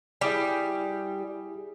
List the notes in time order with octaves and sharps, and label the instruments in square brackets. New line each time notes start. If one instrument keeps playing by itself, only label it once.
[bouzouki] G3 [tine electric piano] E4 G#4 B6